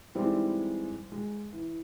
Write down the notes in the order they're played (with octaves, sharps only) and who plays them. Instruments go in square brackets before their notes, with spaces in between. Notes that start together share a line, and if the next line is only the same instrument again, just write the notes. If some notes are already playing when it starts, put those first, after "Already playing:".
[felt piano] E3 G3 G#3 C4 D#4 E4
G#3
E3